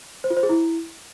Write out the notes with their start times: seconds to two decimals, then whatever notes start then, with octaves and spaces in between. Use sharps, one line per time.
0.24 C5
0.30 F4
0.37 C5
0.43 G#4
0.49 E4